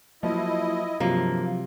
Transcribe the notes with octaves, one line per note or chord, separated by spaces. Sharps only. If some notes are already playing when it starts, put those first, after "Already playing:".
F3 F#3 A#3 E4 D#5
G2 C3 F3 F#3 A#3